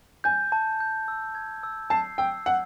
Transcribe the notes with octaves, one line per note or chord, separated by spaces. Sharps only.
G#5 G6
A5
G6
E6
G#6
E6
A5 C7
G5 E6
F#5 E6